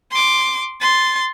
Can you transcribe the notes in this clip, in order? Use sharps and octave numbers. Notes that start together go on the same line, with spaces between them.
C6 D6
C6 A6